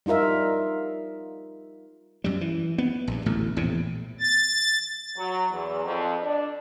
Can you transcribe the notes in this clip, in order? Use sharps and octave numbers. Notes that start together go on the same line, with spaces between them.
G3 D#4 F4 A#4 E5
F#2 G3
E3
B3
A#1 G2
D1 A1 B2 A3
A#1 E2 A2 C3
A6
F#3
E2
F2
D4